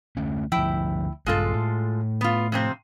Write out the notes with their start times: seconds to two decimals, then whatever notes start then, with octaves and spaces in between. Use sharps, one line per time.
0.17 D2 A3 C#4
0.52 D2 F3 E4 G5
1.26 A#1 G2 G#3 F4 A4
1.54 A2
2.21 B3 F4
2.52 F2 C3 C4